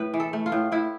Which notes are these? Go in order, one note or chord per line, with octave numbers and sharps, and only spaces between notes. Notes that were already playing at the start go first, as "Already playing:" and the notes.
Already playing: A2 B4
E3
A4
A3
F4
A2
A2 E4